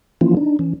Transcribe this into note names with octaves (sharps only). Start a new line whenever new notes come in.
E3 F3 A#3 C#4 E4 F4
D4 D#4
E3 C#4